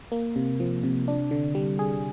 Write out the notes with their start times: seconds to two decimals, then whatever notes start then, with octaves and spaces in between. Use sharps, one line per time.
0.12 A#3
0.36 C3
0.60 F3
0.84 C3
1.08 D4
1.31 D3
1.55 G3
1.79 G#4